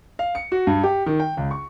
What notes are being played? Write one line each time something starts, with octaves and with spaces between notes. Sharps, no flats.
F5
C#7
F#4
G2
G4
D#3
G5
C#2
C#6